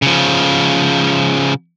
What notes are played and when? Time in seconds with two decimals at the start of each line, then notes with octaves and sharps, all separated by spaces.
0.02 C#3 F3